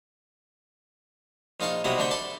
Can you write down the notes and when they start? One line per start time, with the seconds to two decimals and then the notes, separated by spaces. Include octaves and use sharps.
1.60 A#1 D#4 F4 F5 A5 C#6
1.84 B1 C3 F#3 G3 E4 D#5
1.98 D3 A3 C4 D4 E5 G5
2.11 A4 D5 A5 B5 C6